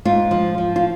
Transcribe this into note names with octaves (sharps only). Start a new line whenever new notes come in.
G#2 F4
F3
F3
F4